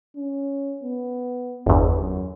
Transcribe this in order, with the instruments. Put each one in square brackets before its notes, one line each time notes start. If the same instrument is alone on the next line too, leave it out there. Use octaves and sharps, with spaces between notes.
[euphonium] C#4
B3
[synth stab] G1 E2
[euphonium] F#2